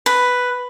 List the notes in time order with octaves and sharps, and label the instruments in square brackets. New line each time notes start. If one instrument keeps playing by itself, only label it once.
[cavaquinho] B4